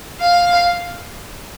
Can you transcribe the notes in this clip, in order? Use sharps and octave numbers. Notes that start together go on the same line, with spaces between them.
F5